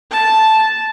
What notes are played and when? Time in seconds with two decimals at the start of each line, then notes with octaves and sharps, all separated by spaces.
0.11 A5